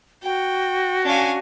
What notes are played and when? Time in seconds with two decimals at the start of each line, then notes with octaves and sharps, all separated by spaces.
0.23 F#4 G5
1.05 C#4 D4 F5 G#5